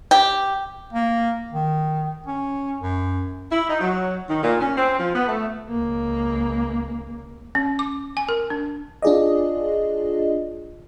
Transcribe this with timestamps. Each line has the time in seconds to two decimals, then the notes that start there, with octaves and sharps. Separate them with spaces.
0.11 G4
0.93 A#3
1.53 D#3
2.27 C#4
2.81 F#2
3.50 E4
3.68 D#4
3.80 F#3
4.29 D#3
4.43 A#2
4.60 C#4
4.76 C4
4.98 F3
5.14 B3
5.27 A3
5.70 C#2 A#3
7.55 C#4
7.79 D6
8.17 G#5
8.29 A#4
8.50 D4
9.02 D4 F4 G#4 D5 D#5